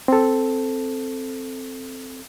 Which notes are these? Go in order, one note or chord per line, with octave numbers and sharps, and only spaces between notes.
C4 A4